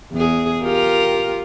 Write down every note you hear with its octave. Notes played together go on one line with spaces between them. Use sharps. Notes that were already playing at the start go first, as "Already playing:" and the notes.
E2 G#4
F4 G4 A#4